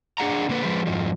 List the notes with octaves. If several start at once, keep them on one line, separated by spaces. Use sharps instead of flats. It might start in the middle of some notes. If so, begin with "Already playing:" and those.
D4 G#4 F#5 A#5
D3 A#3 B4
F3 G#3 B4
F2 G#2 F3